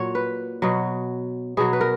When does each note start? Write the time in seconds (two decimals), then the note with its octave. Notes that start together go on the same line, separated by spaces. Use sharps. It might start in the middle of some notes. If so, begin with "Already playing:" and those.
Already playing: A#2 F#3 C#5
0.15 B4
0.62 B2 F#3
1.57 B2 F#3 G#4
1.73 B4
1.81 A#4